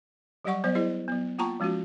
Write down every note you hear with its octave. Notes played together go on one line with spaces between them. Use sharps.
F#3 G3 G4 D5 F#5 C#6
F#3 B3 C5 D5 D#5
E4 G#4 C5 D#5
F#3 B3
A#3 F4 G5 A5 A#5 C#6
F3 G#3 C#4 F4 F#4